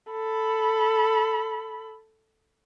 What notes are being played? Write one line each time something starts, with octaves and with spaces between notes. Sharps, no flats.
A4 B5